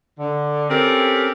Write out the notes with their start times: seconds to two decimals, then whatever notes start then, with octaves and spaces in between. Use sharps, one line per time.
0.20 D3
0.70 C4 C#4 G4 A4 A#4